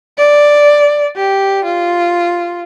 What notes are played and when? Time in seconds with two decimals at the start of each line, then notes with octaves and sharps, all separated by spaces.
0.18 D5
1.16 G4
1.65 F4